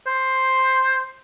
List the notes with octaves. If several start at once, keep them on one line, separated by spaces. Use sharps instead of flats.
C5